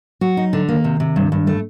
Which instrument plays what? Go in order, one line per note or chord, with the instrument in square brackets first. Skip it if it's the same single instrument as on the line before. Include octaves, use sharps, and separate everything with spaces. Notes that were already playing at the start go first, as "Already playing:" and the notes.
[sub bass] F#3 [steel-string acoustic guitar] F#4
[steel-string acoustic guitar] D#4
D3
[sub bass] D#3 [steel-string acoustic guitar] A#3
[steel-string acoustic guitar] C3
C3
G2
G2
A3